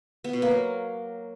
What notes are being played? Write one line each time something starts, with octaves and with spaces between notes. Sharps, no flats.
B3
B2
A#3
F#3